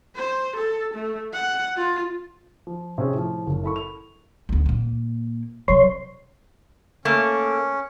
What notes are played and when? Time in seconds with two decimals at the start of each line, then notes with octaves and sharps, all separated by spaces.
0.16 C5
0.56 A4
0.94 A3
1.33 F#5
1.76 F4
2.67 F3
2.98 C3 C#4 G#4
3.14 A2 F3
3.47 F#1
3.63 E4 A4 B5 C#6
3.76 F7
4.49 D2 B3
4.66 A#2 A#3
5.68 C3 F#3 C#5 C6
7.05 A3 A#3 C#4